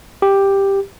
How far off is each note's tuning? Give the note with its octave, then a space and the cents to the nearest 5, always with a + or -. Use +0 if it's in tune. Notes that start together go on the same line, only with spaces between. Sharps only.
G4 +5